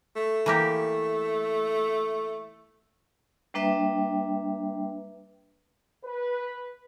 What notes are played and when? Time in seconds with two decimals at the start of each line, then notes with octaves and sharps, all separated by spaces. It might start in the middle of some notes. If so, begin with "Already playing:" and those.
0.16 A3
0.46 E3 A#3 G4
3.54 G3 A#3 D4 B4 E5 G5
6.04 B4